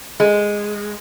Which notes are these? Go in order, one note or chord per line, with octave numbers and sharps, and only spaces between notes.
G#3